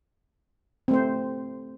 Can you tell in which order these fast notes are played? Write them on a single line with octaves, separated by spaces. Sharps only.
C4 A3 C5